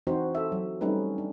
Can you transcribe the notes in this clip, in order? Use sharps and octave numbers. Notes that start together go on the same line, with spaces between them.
E3 C4 D#4 F#4 C5
A4 E5
F#3
G3 A3 C4 C#4 D#4 B4
D4